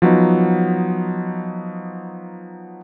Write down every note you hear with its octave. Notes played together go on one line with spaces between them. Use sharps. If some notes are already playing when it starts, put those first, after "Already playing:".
F3 F#3 B3 D#4